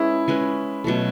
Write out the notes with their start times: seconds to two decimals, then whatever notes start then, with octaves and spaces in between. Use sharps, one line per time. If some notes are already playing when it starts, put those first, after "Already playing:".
Already playing: G#3 C#4 E4 G#4 B4
0.28 G#3 C#4 G#4 B4
0.84 B2 F#3 A3